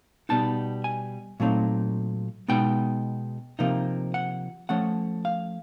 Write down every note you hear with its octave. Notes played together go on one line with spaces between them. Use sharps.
B2 G3 B3 D#4 A5
G#5
A#2 F#3 A3 C4 D#4
B2 G#3 B3 D#4 G5
C3 F3 A#3 D#4
F#5
F3 A3 C#4 F#5
F5